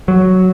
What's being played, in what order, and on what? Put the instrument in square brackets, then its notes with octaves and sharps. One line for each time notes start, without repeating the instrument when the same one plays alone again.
[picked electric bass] F#3